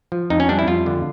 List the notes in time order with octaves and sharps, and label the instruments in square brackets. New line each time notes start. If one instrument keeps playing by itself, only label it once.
[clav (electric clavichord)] F3
F2 D#4
C#4
G3 D4
E4
F2 F4
D3